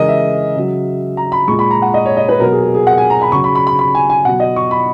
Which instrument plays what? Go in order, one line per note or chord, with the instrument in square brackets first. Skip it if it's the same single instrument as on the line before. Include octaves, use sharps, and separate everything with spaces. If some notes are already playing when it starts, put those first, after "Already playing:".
Already playing: [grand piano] C#3 E3 G#3 G#4 A#4 D#5
E5
C#3 F#3
A#5
B5
A#2 G#3 C#6
B5
A#5
F#5
D#5
C#5
D#5
B4
B2 F#3 A#4
G#4
G#4
G#4
F#5
G#5
A#5
B5
C#3 F#3 C#6
B5
B5
B5
B5
G#5
G#5
B2 F#3 F#5
D#5
C#6
B5